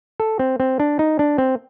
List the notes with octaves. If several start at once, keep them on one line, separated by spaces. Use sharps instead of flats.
A4
C4
C4
D4
D#4
D4
C4